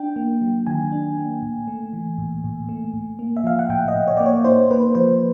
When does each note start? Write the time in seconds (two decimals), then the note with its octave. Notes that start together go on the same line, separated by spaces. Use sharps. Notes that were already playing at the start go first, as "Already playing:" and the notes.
Already playing: D4 G5
0.16 A#3
0.41 F#3
0.67 D#3 G#5
0.92 D4
1.18 A#3
1.42 A2
1.68 A3
1.93 E3
2.18 A2
2.44 A2
2.69 A3
2.93 A2
3.19 A#3
3.37 E5
3.44 F3 F5
3.59 F#5
3.69 A2 G5
3.88 D#5
3.95 A2
4.07 C#5
4.17 A#3 D5
4.26 C#5
4.44 D#4 C5
4.71 A#3 B4
4.95 F3 C5